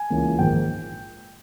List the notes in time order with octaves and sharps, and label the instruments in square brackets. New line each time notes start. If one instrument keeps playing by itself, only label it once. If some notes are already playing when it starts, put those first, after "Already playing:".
Already playing: [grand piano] G#5
C#2 C#3 E3 A#3
A#1 G#2 D#3 A#3 G5